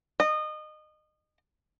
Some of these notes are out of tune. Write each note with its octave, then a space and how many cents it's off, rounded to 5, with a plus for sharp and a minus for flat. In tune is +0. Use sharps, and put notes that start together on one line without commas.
D#5 -25